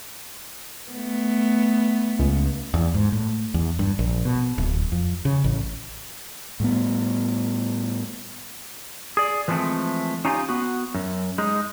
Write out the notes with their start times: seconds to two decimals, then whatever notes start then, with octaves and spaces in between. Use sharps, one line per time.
0.92 A3 B3
2.19 C#2
2.74 E2
2.94 G#2
3.12 A2
3.54 E2
3.79 G2
3.99 A#1
4.25 B2
4.58 D1
4.92 F2
5.25 C#3
5.44 A1
6.60 A2 G3 G#3 B3
9.17 G#4 D5
9.48 E3 F3 G#3 A3 C4
10.25 C#4 D#4 F4 G4 E5 G#5
10.49 B3 F#4
10.95 F#2
11.38 G#3 D#4